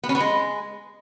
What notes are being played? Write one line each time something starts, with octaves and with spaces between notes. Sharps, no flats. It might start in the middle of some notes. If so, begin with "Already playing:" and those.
B3
C#4
B3
G#3